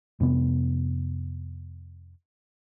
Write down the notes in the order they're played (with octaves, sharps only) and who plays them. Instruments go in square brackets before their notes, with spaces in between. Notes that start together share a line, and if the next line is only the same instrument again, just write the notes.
[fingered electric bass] F2 C3 B3